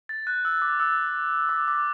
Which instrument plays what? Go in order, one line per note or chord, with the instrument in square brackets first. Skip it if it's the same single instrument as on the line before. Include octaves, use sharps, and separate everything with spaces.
[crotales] A6
F#6
E6
D6
E6
D6
D6